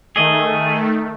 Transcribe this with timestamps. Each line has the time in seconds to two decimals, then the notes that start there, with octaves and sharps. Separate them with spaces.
0.16 D#3 A3 G#4 D#5